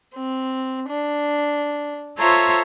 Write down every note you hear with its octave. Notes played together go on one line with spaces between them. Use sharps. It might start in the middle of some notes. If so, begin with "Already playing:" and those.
C4
D4
F4 A4 C5 C#5 E5 A#5